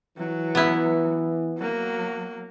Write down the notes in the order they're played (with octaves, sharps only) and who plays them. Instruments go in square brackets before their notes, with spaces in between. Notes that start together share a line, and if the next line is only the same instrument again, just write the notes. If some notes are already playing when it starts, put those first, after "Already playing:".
[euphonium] E3 [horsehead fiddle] F#3
[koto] B3 E4
[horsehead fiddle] F#3 A#3